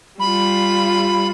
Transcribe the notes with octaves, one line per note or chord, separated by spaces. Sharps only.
G3 F4 B5